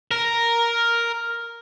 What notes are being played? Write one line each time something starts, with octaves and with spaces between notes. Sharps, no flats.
A#4